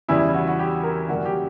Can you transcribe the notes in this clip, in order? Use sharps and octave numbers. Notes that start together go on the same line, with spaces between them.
E2 C#3 E3 G3 E4
F#4
F#4
G4
A#4
F#2 C#3 G3 A#3 F#4
G4